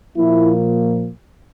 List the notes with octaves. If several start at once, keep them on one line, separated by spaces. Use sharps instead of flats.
A#2 F3 A#3 E4